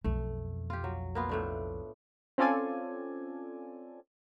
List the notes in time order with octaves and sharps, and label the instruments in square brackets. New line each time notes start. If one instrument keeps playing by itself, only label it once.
[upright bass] B1 F2 [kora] A3
[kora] F4 G4
F#3
A#3 B3 F4
A2 A3 D4
[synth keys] C4 C#4 F4 A4 D5 G#5